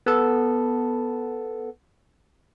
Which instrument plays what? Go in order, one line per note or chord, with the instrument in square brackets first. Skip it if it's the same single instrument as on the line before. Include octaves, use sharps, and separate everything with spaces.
[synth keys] B3 A4